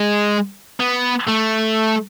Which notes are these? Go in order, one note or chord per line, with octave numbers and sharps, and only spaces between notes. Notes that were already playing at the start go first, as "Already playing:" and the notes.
Already playing: G#3
B3
A3